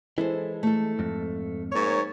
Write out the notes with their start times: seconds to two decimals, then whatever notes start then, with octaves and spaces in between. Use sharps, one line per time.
0.18 E3 G#3 E4 A4 C5
0.63 A3 A4
0.99 F2 G#2
1.72 G#2 A#3 C#5